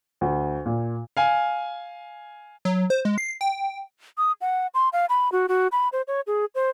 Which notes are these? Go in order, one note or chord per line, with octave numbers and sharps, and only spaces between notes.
D2
A#2
F5 G#5
F#3
C5
G#3
C7
G5
D#6
F#5
C6
F5
B5
F#4
F#4
B5
C5
C#5
G#4
C5